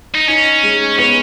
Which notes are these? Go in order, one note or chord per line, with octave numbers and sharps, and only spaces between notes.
D#4
C#4 D#4
G#3
B3 C#4